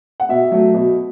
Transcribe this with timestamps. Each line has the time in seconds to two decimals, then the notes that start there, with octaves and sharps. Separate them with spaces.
0.20 F#5
0.29 B2 E5
0.51 F#3 A3
0.74 B2